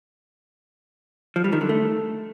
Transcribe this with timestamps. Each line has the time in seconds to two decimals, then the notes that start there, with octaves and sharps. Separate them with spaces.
1.36 F3
1.44 G3
1.53 D#3
1.61 D3
1.69 A3